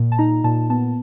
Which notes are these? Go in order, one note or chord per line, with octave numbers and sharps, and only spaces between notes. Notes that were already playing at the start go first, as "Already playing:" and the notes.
Already playing: A#2
A5
D#4 A#5
A#2 A5
B3 A5